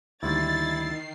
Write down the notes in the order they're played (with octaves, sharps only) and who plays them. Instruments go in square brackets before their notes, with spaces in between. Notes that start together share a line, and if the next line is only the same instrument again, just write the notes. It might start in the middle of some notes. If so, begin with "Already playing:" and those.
[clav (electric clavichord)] D2 G3 A#3 [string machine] D#3 C7 [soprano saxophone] E4 [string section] A6